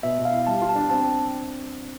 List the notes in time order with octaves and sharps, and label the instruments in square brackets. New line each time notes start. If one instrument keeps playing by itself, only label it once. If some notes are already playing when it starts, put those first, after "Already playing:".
[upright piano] B2 [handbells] E5
[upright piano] B2
[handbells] F5
[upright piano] E4
[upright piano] G3 [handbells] A5
[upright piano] F4
[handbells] A5
[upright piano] D4
[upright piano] C4 [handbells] A5
[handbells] G5